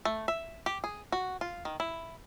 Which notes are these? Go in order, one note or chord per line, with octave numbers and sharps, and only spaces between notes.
A3
E5
G4
G#4
F#4
F4
D#3
E4